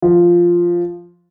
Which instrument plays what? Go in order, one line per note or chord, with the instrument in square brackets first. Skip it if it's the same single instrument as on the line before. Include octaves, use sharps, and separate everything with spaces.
[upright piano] F3